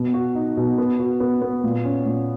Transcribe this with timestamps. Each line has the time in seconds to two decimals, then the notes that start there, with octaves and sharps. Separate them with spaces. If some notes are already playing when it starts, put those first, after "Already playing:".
Already playing: B2 B3
0.14 F#4
0.35 D#4
0.57 B2
0.78 B3
1.00 F#4
1.20 B3
1.42 B3
1.64 A#2
1.84 C#4
2.06 A#2